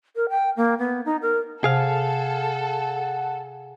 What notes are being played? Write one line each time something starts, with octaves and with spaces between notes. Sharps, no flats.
A#4
G5
A#3
B3
D#4
A#4
C3 G#4 A4 F5 F#5